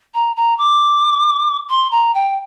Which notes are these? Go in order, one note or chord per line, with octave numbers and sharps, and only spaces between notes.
A#5
A#5
D6
C6
A#5
G5